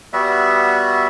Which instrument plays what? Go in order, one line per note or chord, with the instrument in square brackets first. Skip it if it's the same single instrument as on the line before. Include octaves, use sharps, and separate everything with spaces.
[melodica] G3 B3 F#4 E5